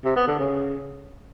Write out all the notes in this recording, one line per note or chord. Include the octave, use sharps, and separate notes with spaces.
C3
B3
D3
C#3